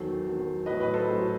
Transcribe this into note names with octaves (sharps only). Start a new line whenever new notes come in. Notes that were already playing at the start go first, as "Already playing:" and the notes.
Already playing: E2 D#3 F#3 A4 C5
E2 D#3 F#3
A2 F#3 B4 D#5
B4 D#5
A4 C5
A2 F#3